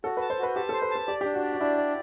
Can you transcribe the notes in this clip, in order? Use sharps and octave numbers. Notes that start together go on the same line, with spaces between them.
F#4 A4
B4
A5
C5
F#4 B4
G4 A5
A4 C5
B4
A4 A5
G4 D5
D4 G4
F#4
D5
F#4
D4 E4
D5